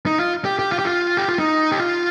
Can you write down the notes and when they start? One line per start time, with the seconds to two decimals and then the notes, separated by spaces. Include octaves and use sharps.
0.06 D#4
0.18 F4
0.45 G4
0.59 G4
0.72 F4
0.79 G4
0.85 F4
1.17 G4
1.28 F4
1.39 D#4
1.72 G4
1.80 F4